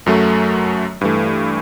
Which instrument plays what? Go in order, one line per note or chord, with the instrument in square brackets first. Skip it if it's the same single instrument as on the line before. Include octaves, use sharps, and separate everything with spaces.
[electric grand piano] F#2 F#3 A3
G2 E3 A3